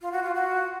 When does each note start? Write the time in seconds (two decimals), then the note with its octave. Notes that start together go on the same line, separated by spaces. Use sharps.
0.01 F4
0.12 F#4
0.23 F4
0.34 F#4